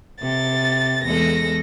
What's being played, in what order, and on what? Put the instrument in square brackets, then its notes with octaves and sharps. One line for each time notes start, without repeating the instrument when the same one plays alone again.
[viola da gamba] C3 [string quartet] A6
[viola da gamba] E2 G#3 A4 [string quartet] A#6